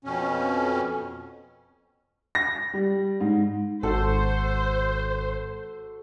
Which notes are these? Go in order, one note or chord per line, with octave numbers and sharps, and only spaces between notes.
F2 B2 C#4
A#6
G3
G#2
G#1 F#4 A4 C5